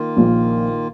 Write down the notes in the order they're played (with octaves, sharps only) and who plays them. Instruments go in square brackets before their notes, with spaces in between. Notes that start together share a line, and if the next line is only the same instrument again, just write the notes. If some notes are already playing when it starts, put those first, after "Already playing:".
Already playing: [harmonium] D#3 A#3 F4
[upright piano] A#1 A#2